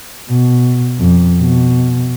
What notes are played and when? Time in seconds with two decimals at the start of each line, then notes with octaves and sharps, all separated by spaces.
0.30 B2
1.00 F2
1.40 B2